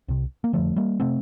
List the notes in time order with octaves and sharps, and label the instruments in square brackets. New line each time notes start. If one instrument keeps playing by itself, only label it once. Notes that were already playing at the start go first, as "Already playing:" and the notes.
[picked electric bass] C2 C3
A#3
F2 D3 F3 A3
G3 A#3
C3 A3 C4